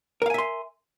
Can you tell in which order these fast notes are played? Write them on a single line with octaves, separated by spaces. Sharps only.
A#4 F5 G#5 E5 C6